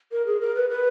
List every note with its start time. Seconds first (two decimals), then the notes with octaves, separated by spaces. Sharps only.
0.12 A#4
0.26 G#4
0.41 A#4
0.55 B4
0.70 B4